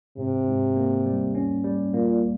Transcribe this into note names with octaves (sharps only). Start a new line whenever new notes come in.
G#2 C3
G#2
A#3
G3
C#4
G3
A#2 A#3